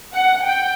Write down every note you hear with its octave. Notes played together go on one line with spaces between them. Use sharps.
F#5
G5